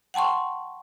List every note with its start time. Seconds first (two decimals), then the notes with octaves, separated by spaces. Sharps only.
0.14 F#5 G5 A5 C6 C#6